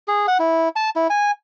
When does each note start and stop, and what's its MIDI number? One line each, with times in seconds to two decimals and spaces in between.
0.08 0.26 68
0.28 0.38 78
0.39 0.69 64
0.76 0.90 81
0.96 1.07 64
1.10 1.31 80